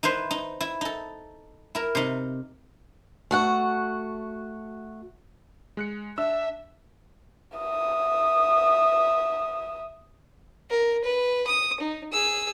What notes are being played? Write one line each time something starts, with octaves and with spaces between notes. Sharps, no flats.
D#4 E4 B4 C5
D#4
E4
D#4 A4
E4 A#4
C3 D#4
A3 F#4 F#5
G#3 F#6 C#7
D4 E5 E6
E5 D#6
A#4
B4
D#6
D#4
G#4 E6